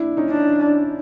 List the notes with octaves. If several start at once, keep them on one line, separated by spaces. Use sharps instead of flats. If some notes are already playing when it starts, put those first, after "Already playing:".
Already playing: D4 E4
C#4 D#4
D4